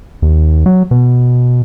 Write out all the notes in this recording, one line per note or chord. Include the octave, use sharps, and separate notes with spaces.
D#2
F#3
B2